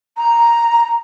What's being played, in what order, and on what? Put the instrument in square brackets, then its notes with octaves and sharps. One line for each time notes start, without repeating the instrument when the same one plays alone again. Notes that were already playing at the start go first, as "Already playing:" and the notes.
[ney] A#5